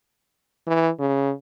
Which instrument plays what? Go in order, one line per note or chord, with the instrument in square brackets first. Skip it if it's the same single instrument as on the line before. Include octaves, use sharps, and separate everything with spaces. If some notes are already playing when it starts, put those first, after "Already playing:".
[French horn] E3
C#3